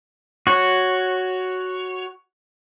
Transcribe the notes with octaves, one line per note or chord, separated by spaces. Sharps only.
F#4 C#5